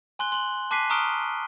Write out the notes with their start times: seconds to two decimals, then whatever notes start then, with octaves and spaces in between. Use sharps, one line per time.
0.19 G#5 C6 F#6 G7
0.32 C6 F#7
0.71 A5 D6 F#6 B6 C7 D#7
0.90 A#5 C#6 D#6 F6 D7 G7